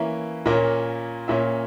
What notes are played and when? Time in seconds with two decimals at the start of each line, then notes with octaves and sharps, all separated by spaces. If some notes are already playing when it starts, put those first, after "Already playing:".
Already playing: E3 A#3 C#4 E5
0.46 A#2 A#3 C#4
1.28 A#2 A#3 C#4 E5